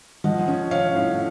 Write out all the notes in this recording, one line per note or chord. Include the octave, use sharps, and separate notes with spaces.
F3 D#5 F#5
C#4
C#4 C#5 F5
A2